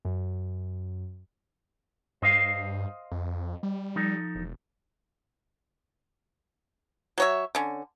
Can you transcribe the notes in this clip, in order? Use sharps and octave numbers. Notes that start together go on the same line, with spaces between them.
F#2
G2 C5 D#5 F5
F2
G3
F3 D#4 A4
E1
F#3 C#5 E5
D3 C#4